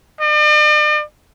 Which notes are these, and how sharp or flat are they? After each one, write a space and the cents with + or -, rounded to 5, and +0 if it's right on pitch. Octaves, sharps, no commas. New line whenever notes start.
D5 +45